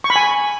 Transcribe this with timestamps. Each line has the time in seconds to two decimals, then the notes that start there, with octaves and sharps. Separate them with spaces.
0.04 C#6
0.10 B5
0.16 G#5